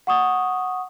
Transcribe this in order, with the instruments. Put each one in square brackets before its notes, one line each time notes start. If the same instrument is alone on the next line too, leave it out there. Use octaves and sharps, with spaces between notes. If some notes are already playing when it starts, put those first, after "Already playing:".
[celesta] F#5 C#6 D#6